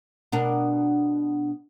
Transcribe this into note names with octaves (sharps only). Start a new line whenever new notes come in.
B2 D4 A#4